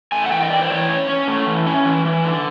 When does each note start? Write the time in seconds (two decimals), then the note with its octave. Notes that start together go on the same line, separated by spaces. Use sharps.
0.12 A3 G#5
0.26 F#5
0.31 E3 G5
0.43 D#5
0.50 E3 D5
0.62 C5
0.70 E3 C#5
0.89 C#4
1.09 C#4
1.28 A3
1.47 E3
1.66 C#4
1.86 E3
2.05 E3
2.24 D3